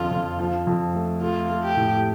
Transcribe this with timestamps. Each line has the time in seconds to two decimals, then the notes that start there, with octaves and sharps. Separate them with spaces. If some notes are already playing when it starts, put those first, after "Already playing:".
Already playing: F2 D3 F4
0.11 F2
0.39 F3
0.67 F2
0.94 A3
1.21 A3 F4
1.49 A3
1.63 G4
1.76 A2